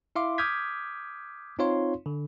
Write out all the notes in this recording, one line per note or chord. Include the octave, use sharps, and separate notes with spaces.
E4 E5 F5 C6 D6
D6 D#6 F6 G6 G#6 B6
C4 D#4 F4 C#5 F5 C6
D3